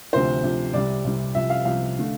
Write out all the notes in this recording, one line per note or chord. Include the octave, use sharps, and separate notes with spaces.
D2 C3 F3 C5
D2 C3 F3
C2 C3 G3 D5
C2 C3 G3
C2 C3 F3 E5
F5
C2 C3 F3 F5
D3 A3